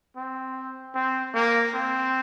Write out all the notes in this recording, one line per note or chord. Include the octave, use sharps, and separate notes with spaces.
C4
C4
A#3
C4